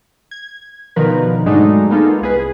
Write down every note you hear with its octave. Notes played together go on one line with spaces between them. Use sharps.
G#6
B2 D3 D#3 F3 A#4 B4
G#2 F#3 G#3 A3 D4 D#4
G#3 A#3 B3 D#4 F4 A4
C2 G#4 B4